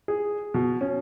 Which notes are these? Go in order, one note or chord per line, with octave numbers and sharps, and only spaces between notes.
G#4
B2
C#4